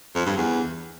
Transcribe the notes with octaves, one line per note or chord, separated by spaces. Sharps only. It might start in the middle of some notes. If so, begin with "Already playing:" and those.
F2
G2
E2